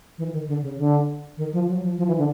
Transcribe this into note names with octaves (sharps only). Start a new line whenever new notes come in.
E3
D#3
D3
C#3
D3
D#3
F3
F#3
F3
F3
E3
D3